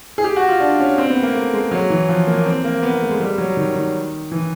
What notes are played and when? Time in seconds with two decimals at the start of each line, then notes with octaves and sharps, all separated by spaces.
0.18 G#4
0.24 G4
0.36 F#4
0.49 F4
0.60 D4
0.80 C#4
0.98 C4
1.10 B3
1.23 A#3
1.35 A3
1.53 G#3
1.71 F#3
1.90 E3
2.09 F3
2.27 A#3
2.46 C4
2.64 A#3
2.83 B3
2.92 A#3
3.01 A3
3.10 G#3
3.20 G3
3.38 F#3
3.57 D#3
3.75 D#3
4.31 E3